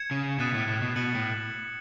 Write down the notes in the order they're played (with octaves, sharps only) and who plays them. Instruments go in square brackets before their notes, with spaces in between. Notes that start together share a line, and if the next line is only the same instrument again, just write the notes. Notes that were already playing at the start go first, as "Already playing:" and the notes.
Already playing: [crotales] G#6 C#7 E7
[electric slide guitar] C#3
[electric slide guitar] B2 [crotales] D#6 F#6 A6 E7
[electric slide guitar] A2
A2
B2
[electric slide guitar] B2 [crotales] F#6 C#7 F#7
[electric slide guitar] A2